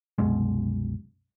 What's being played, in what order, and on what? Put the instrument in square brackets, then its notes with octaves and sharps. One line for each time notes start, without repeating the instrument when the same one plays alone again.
[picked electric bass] C2 F#2 B2 G#3